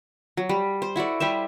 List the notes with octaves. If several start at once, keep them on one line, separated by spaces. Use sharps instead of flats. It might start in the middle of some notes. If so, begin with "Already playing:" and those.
F#3
G3
C5
E4 F#4 A4 D5
G3 G4 C5 E5